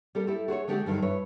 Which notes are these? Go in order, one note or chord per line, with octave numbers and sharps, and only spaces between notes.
G3 A4 A#4
E4 G4 A4
F#4 G#4 C5 C#5
D3 G#3 A3 D4 F#4 G4
G2 D3 D#3 F#3
G2 E4 B4 C#5